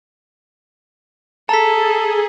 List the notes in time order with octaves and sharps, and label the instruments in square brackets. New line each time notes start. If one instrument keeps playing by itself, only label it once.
[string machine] G#4 [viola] A4 [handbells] A5 [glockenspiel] A#5 B6